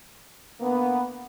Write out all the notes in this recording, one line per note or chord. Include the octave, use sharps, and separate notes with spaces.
D3 A#3 B3